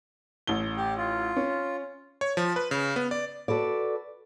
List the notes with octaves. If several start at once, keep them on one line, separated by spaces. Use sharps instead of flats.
A1 G7
G4
F4
C#4
C#5
F3
B4
C#3
B3
D5
F#4 A4 B4 D5